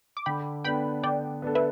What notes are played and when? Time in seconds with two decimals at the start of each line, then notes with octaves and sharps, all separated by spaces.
0.17 D6
0.26 D3 G5 B5
0.64 B3 D4 A4 G5 B5
1.03 D3 D5 G5
1.42 B3 D4 A4
1.55 B4 E5